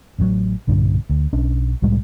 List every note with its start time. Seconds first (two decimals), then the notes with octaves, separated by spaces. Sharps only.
0.18 A1 A2 C#3 F#3
0.67 B1 G2 A#2 D3
1.09 D2
1.33 B1 C#4 D4
1.82 C2 A2 G3 G#3